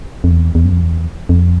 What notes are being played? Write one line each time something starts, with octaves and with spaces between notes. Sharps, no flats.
F2
E2
E2
F#2
F2
E2
F2